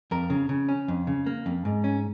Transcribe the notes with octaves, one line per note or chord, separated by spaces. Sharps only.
F2 A#4
C#3
C#3
C#4
F2
C#3
A#3
F2
G#2
C#4